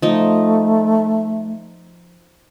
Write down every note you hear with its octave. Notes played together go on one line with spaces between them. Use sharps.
F3 A3 D#4